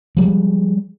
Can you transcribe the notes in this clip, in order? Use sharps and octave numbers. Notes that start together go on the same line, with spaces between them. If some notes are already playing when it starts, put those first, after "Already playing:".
F3 G3 G#3